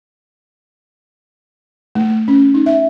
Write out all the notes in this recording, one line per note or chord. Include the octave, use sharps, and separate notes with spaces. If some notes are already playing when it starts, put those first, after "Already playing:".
A3
C#4
D#4
E5